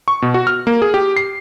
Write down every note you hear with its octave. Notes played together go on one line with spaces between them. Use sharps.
C#6
B2
F#4
F6
A#3
G#4
G4
C7